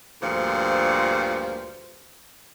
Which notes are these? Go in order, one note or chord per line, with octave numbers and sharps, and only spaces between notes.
D2 G2 A#2 F3 C5